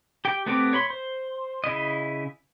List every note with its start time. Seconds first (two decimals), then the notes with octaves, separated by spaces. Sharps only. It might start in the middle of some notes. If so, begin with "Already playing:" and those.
0.25 G4 G5
0.46 A3 B3 C4 G4 D6
0.73 C#5 B5 C6
0.90 C5
1.64 C#3 E4 D#5